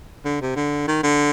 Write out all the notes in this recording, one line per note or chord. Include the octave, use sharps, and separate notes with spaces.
D3
C3
D3
D#3
D3